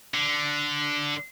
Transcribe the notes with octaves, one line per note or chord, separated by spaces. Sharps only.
D3